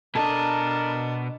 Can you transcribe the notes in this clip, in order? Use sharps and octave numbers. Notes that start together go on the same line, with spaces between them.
B2 D4 A4 A#4 D#5